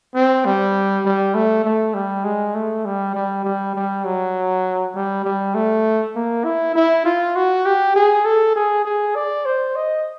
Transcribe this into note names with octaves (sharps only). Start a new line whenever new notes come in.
C4
G3
G3
A3
A3
G3
G#3
A3
G3
G3
G3
G3
F#3
G3
G3
A3
A#3
E4
E4
F4
F#4
G4
G#4
A4
G#4
G#4
D5
C5
D#5